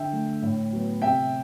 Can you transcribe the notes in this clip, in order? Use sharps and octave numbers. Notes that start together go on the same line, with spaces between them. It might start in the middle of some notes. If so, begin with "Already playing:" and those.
Already playing: D3 E5 G5
A3
A2
F#3 B3
C3 E5 G5